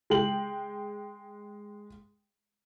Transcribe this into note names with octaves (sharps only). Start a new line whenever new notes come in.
G#3 G5 F#7